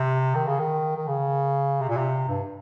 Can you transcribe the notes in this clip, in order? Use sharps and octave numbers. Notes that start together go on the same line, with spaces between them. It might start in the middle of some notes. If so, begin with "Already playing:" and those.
Already playing: C3
D#3
C#3
D#3
D#3
C#3
C3
A#2
C3
G2